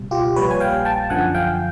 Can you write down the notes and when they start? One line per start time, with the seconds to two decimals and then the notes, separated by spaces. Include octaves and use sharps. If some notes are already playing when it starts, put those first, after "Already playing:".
Already playing: C#2 B2 G3
0.11 F4 G4
0.36 A#1 A#2 G3 B4 C#5
0.51 G#5
0.60 F5 G5
0.85 G5 A5
1.10 F#2 D3 F3 F#5 G#5
1.34 F5 G5